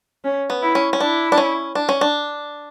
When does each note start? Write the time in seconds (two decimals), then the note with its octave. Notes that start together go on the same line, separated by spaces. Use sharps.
0.24 C#4
0.50 B3
0.62 E4
0.75 C#4
0.93 C#4
1.00 D4 E4
1.32 D4
1.38 C#4
1.75 D4
1.89 C#4
2.01 D4